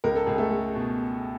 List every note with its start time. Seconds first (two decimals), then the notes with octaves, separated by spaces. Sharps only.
0.04 C#2 A#4
0.15 A4
0.26 C#2 G#4
0.38 A3 A4
0.51 G#3
0.75 B2